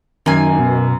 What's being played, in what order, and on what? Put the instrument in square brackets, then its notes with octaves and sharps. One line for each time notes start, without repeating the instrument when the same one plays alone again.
[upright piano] F#2 [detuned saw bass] D#3 [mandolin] A#3 G#5
[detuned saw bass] B2